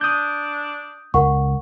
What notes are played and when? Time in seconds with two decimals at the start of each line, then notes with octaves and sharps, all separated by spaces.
0.01 D4 D#6 G6
1.14 C#2 A#4 F#5 C#6